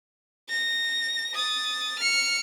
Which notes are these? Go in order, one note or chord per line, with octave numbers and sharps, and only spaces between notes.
A#6
D#6 A6
F6 C#7